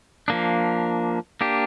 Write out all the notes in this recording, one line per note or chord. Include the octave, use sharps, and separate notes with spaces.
F3 A#3 D4
A#3 D4 G4